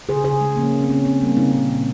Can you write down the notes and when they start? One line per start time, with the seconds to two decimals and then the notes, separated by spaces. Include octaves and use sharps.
0.09 C#3 G#4 C5
0.24 C#3 G#4 C5
0.41 G#3
0.57 F3 A#3 C#4
0.73 C#3
0.82 C4
0.89 C#3 A#3 C#4
1.05 A#3 C4
1.21 G3 A#3 C#4
1.37 C#3 C4 D#4
1.53 A#2 C4
1.69 A#2